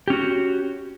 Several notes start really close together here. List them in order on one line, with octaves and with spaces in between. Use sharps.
G4 C#4 F#4